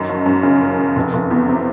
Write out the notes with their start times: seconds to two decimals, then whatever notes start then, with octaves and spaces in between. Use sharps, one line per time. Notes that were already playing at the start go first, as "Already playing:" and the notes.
Already playing: F#2 D#3
0.09 F#1
0.26 F#2
0.43 C#3
0.61 F#1
0.79 F#1
0.96 F1
1.14 F1
1.31 E2
1.48 C3